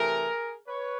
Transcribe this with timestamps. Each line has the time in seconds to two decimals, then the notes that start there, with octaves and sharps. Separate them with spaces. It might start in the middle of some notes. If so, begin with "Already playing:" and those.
Already playing: C3 E3 A3 G#4 A#4
0.68 B4 C#5